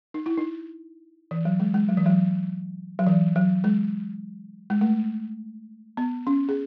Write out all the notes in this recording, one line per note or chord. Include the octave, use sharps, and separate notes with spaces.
D#4
E4
D#4
E3
F#3
G#3
G#3
F#3
E3
F#3
F#3
E3
F#3
G#3
G#3
A3
B3
C#4
G#4